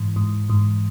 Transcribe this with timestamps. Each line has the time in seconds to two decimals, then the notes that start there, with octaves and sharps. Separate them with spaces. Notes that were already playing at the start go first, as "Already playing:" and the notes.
Already playing: G#2 E3
0.16 G#2
0.50 G#2